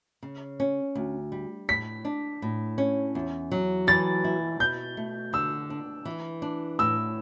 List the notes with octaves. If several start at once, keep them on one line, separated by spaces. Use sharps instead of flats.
C#3
C#4
D2
G3
A2 B6
D4
A2
C#4
E2
F#3
E3 A6
E4
B2 G6
A3
D3 E6
D4
E3
D4
A2 E6